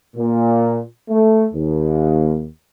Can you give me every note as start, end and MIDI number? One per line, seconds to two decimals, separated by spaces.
0.16 0.79 46
1.09 1.47 57
1.53 2.45 39